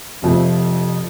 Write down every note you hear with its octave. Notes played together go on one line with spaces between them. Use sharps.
F1 F2 F3 A3